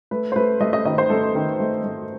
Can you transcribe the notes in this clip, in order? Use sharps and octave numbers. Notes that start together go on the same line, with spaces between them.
A3 B4
C5
A3 B4
A3 D#5
D#5
D#3 D#5
C5
A3 A4
D#3
A3
A3